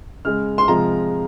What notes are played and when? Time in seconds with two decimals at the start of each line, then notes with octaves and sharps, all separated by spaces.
0.25 C#3 G#3 F6
0.58 C6
0.68 C3 F3 G#3 A#5